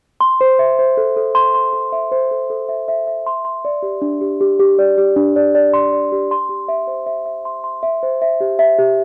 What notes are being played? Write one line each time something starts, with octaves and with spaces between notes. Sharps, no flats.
C6
C5
E5
C5
A4
A4
C6
C6
A4
E5
C5
A4
A4
E5
E5
E5
C6
C6
D5
G4
D4
G4
G4
G4
D5
G4
D4
D5
D5
C6
D5
G4
C6
G4
E5
C5
E5
E5
C6
C6
E5
C5
E5
G4
E5
G4